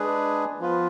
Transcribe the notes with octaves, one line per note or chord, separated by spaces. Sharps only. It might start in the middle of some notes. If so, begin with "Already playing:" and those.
Already playing: G#3 D4 G#4 B4
F3 B3 F4 B4